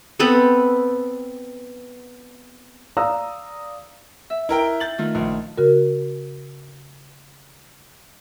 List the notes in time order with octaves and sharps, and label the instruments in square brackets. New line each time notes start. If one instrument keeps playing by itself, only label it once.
[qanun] B3 C4 A4 B4
[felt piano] D5 F5 A#5 D#6 E6
[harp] E5
[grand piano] E4 A#4 G5
G6 A6 F#7
[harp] D#3 A3 F4
[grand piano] A#1
[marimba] C#3 F#4 A#4